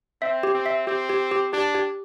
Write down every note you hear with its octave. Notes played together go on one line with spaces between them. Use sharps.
C4 E5
G4
C4
E5
C4 G4
G4
G4
D4 G4
G4